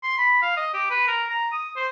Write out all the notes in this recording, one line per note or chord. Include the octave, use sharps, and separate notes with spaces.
C6
B5
F5
D#5
G4
B4
A#4
A#5
D#6
C5